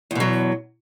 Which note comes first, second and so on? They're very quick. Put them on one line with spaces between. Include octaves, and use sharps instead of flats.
E2 B2 F#3